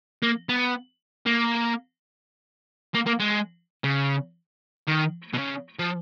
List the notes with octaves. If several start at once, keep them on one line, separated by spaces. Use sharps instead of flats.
A#3
B3
A#3
A#3
A#3
G#3
C#3
D#3
B2
C#3
F3